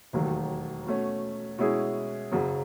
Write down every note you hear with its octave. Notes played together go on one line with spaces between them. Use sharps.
E1 D#2 D#3 F#3 A3
B2 A3 C#4
B2 G#3 C#4 E4 G#4
F#1 F#2 C#3 F#3